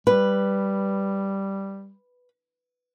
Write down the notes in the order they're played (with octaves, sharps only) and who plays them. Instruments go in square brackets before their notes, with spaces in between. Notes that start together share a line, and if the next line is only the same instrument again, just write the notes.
[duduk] G3 [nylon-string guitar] B4